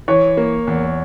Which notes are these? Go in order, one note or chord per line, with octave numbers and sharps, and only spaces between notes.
E3 C#5
A#3
E2